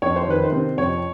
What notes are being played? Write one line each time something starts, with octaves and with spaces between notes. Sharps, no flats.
F2 C#5
C5
D#3 B4
C5
C3
F2 C#5